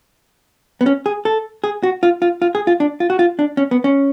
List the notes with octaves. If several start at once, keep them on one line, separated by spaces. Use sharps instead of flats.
B3
C#4
G#4
A4
G#4
F#4
F4
F4
F4
G#4
F4
D4
F4
F#4
F4
D4
C#4
B3
C#4